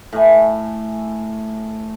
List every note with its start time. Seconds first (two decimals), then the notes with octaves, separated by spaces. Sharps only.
0.12 A2 A3 G#5